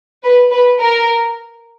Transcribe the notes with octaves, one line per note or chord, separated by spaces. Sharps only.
B4
B4
A#4